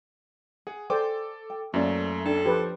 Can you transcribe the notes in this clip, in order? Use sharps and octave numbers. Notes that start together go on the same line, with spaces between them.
G#4 F#5
A4 C5 D5 G5 G#5 D6
G5
F#2 A3 A#3 C#4 E4 C5 D5
D4 A4 C#5 G5
F3 G4 B4 C5